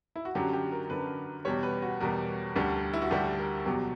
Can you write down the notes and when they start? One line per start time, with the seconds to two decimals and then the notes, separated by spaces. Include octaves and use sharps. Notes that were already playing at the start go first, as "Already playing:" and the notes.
0.16 E4
0.25 F#4
0.35 F#2 D3 F#3 G4
0.53 G4
0.72 A#4
0.90 F#2 D3 F#3 B4
1.45 E2 B2 G3 C#5
1.63 B4
1.82 F#4
2.00 E2 B2 G3 A#4
2.56 D2 D3 G3
2.93 E4
3.02 F#4
3.11 D2 D3 G3 G4
3.39 A#4
3.65 E2 B2 F#3 G4